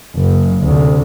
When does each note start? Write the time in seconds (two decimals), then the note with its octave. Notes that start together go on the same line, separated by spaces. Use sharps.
0.16 F#1
0.61 D2 C3